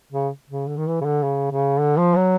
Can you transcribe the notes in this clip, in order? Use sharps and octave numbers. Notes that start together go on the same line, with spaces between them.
C#3
C#3
D3
D#3
E3
C#3
D3
C#3
C#3
D3
F3
F#3